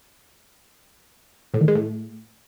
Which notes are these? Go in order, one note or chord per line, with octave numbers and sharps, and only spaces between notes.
A2
D#3
G#3
A2